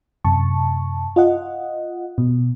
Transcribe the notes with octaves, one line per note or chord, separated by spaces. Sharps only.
F#2 C3 A5 C#6
F4 D#5 F#5
B2